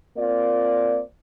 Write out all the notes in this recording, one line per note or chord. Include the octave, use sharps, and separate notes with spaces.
A#3 C4 F4 D5